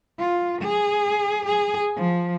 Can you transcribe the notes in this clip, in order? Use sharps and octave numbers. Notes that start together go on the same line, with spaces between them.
F4
G#4
G#4
F3